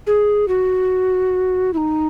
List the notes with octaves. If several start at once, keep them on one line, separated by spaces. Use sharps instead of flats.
G#4
F#4
E4
D#4